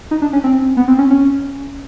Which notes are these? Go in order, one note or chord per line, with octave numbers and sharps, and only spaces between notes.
D#4
D4
C#4
C4
B3
C4
C#4
C#4